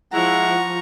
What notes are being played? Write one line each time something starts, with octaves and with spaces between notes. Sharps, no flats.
F3 G#3 E4 F#5 A#5 C#6